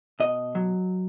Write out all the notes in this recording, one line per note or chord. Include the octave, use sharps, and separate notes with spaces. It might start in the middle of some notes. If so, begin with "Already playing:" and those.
B2 D#5
F#3